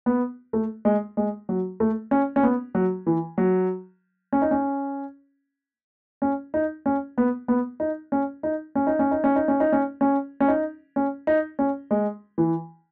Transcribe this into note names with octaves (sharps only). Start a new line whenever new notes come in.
B3
A3
G#3
G#3
F#3
A3
C#4
C#4
B3
F#3
E3
F#3
C#4
D#4
C#4
C#4
D#4
C#4
B3
B3
D#4
C#4
D#4
C#4
D#4
C#4
D#4
C#4
D#4
C#4
D#4
C#4
C#4
C#4
D#4
C#4
D#4
C#4
G#3
E3